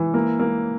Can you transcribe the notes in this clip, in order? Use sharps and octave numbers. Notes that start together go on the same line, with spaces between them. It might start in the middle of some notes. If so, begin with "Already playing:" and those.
Already playing: E3
A#3
A#3